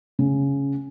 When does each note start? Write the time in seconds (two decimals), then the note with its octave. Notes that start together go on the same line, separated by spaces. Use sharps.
0.19 C#3